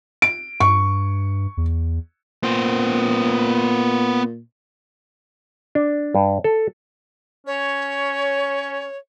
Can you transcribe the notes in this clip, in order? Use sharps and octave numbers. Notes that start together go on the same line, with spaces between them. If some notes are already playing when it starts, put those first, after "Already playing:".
D7
G2 C#6
E2
A#2 B3 C5
D4
G2
A4
C#4 C#5